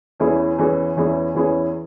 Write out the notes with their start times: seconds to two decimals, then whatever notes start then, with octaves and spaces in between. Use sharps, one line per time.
0.20 E2 E3 C#4 E4 G#4
0.58 E2 E3 C#4 E4 G#4
0.96 E2 E3 C#4 E4 G#4
1.35 E2 E3 C#4 E4 G#4